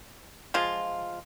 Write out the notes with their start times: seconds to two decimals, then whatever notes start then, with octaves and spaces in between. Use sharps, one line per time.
0.54 F3 G#3 F4